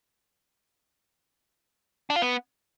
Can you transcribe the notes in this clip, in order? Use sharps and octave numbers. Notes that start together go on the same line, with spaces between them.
D4
F4
B3